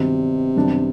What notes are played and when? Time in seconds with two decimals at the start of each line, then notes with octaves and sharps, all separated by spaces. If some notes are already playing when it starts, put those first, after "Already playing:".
Already playing: G2 C3 D#3 F#3 B3
0.56 F#2 D#3 G3 B3 D4